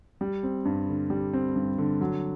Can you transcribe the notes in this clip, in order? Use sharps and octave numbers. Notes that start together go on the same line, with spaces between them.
G3
C4
G2
D3
G3
C4
G2
D3
F#3